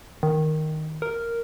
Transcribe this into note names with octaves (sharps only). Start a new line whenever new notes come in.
D#3
A#4